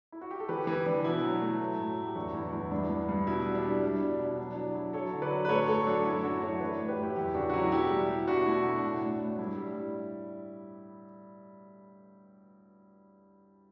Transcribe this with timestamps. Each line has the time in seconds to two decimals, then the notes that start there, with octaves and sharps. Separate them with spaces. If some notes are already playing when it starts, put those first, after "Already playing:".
0.12 E4
0.21 F#4
0.31 G4
0.40 A4
0.49 E3 G4 B4
0.67 E3
0.86 E3 D4
1.04 B2 E4
1.23 F#3
1.41 A3
1.60 F#3
1.79 A2
1.97 A2
2.07 G4
2.15 E2 D4 F#4
2.34 E2 E4
2.52 E2 E4
2.71 G2 D4
2.90 G2
3.09 G2
3.27 B2 E4
3.46 G3
3.55 D4
3.64 G3
3.82 G3 D4
4.00 B2 D4
4.20 B2 E4
4.38 F#3 D4
4.57 F#3 D4
4.75 F#3 E4
4.93 F#3 A4 C#5
5.13 D3
5.22 B4 D5
5.31 F#3
5.45 B4
5.49 A2 A4 C#5
5.68 A2 A4 C#5
5.87 F#3 D4
6.05 F#2 E4
6.23 A3 D4 F#4
6.42 F#2 A4 C#5
6.61 E3 B4 D5
6.79 A2
6.88 G4 B4
6.98 A2
7.03 E4 G4
7.16 E2 E4 G4
7.34 C#3 D4 F#4
7.50 F#4
7.53 F#3 E4
7.72 B2 E4 G4
7.91 G3
8.09 G3
8.27 B2 D4 F#4
8.46 A3 E4
8.65 B2 E4
8.79 A2 D4
9.02 A2 D4
9.20 A2
9.39 G2 E4
9.57 G3